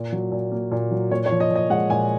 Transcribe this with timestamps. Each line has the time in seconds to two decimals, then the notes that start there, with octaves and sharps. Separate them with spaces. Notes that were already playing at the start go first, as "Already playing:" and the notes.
Already playing: A#2
0.12 F#3
0.32 A#2
0.52 A#3
0.71 A#2
0.91 F#3
1.11 A#2 C#5
1.26 C#5
1.31 F3
1.40 D#5
1.50 A#2
1.55 D#5
1.70 G#3 F#5
1.90 A#2 G#5